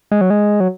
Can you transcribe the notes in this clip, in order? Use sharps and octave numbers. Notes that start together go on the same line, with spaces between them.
G#3
F#3
G#3
F#3